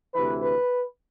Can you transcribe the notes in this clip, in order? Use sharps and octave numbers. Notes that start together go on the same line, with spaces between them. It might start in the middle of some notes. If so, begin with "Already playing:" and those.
D2 C3 E3 B4
B4